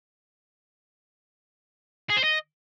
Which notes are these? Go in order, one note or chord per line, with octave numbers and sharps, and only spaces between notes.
G#4
C5
D#5